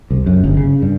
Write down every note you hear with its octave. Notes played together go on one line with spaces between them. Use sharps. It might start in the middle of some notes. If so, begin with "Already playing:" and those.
C2
F#2
G1
C#3
G2